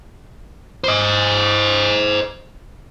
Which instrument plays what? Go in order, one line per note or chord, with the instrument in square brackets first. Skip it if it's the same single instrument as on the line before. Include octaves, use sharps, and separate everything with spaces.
[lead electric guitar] C5 D#5